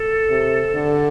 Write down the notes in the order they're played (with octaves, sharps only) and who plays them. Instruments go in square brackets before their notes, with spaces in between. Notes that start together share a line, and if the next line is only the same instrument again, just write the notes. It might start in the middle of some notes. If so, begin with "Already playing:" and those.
Already playing: [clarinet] A4
[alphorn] C3
D3